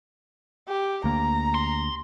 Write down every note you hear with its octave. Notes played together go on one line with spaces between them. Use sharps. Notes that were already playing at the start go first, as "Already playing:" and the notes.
G4
D2 A#3 A#5
C6